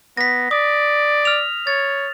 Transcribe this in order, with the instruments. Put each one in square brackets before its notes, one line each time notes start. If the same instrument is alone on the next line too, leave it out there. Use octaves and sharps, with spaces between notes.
[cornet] B3 [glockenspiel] A#6 B6
[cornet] D5 [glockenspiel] D#6
[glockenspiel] F6 F7
[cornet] C#5 [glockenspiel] A6